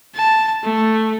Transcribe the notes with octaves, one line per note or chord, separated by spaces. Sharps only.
A5
A3